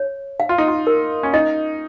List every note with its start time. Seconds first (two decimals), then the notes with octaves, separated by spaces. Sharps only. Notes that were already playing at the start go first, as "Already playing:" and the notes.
Already playing: C#5
0.40 F5
0.49 F4
0.58 D#4
0.68 F4
0.87 A#4
1.23 C#4
1.34 D#4 D#5